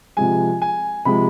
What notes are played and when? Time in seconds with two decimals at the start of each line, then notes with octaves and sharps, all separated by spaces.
0.17 C3 F3 G#3 G#5
0.62 G#5
1.05 C3 F3 G#3 B5